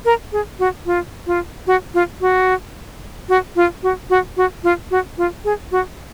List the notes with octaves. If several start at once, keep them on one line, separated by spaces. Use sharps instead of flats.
A#4
G#4
F#4
F4
F4
F#4
F4
F#4
F#4
F4
F#4
F#4
F#4
F4
F#4
F4
G#4
F#4